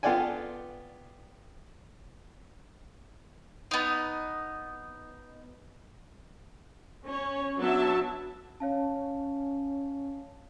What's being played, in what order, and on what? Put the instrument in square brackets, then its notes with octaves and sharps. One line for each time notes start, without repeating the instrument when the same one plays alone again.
[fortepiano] B3 F4 A4 D5 G5 G#5
[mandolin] B3 D#4
[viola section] C#4 C#5
F#3 B3 D4 E5 A5
[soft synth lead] C#4 [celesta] C#5 F5 A5